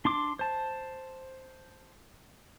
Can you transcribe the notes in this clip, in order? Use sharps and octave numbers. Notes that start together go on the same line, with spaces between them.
D4 C6 D6
C5 A5